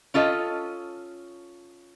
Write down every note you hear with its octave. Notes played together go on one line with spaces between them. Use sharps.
C#4 F4 A4 D#5